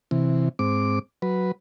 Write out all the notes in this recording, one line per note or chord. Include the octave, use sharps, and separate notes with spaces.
C3 E3
G#2 C4 D6
F#3 B4